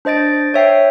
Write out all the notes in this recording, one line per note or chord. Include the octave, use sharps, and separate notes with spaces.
D4 C5 D#5 A6 D7
C#5 E5 G5 C7